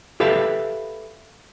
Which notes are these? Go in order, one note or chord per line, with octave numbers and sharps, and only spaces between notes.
G4 A4 B4 E5 F5